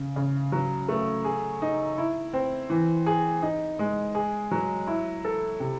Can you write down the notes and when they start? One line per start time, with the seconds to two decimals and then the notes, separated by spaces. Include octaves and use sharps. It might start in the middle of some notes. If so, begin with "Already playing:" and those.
Already playing: C#3
0.16 C#3
0.52 F#3
0.89 A3
1.24 G#4
1.62 D#4
1.98 E4
2.33 C4
2.70 E3
3.06 G#4
3.42 D#4
3.79 G#3
4.15 G#4
4.51 F#3
4.87 E4
5.25 A4
5.60 C3